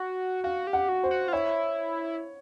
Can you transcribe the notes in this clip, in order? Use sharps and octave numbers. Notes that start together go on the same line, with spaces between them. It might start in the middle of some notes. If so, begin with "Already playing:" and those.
Already playing: F#4 F#5
F#4 F5
G4
F#5
F#4
C5
F#4
F4
E4 C#5